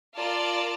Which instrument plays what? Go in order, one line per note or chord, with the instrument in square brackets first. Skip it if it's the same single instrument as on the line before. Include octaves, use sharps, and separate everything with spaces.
[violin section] F4 A#4 D5 A5